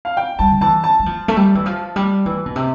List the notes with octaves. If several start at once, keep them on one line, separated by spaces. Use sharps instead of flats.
F5
G5
G3 A5
D3
E3 A5
A5
G3
F3
A3
G3
E3
F3
G3
E3
B2
C3